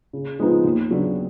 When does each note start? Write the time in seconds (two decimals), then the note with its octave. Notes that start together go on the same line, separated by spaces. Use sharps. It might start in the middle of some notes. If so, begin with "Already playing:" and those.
0.13 C#3
0.39 F3 G#3 B3 D#4
0.64 D#2
0.90 C#3 F#3 B3 D4